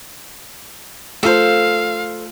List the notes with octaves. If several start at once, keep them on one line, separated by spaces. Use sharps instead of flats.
A3 F4 A4 C5 F5